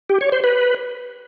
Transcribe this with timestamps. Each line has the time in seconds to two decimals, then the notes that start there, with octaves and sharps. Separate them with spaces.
0.09 G4
0.21 C#5
0.32 C5
0.44 B4